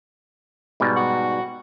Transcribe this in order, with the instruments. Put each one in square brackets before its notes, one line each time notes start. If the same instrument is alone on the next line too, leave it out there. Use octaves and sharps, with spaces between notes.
[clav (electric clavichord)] G#2 B2 G3
[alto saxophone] F#4